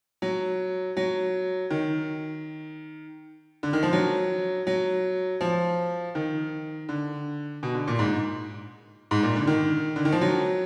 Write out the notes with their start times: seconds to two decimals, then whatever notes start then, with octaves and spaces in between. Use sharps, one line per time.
0.22 F#3
0.97 F#3
1.70 D#3
3.63 D3
3.73 D#3
3.83 F3
3.93 F#3
4.67 F#3
5.41 F3
6.15 D#3
6.89 D3
7.63 B2
7.75 D3
7.88 A#2
7.99 G#2
9.11 G#2
9.23 A#2
9.36 D3
9.47 D#3
9.96 D3
10.05 D#3
10.12 F3
10.21 F#3